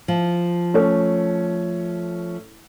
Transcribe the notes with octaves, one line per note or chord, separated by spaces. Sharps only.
F3
A3 C#4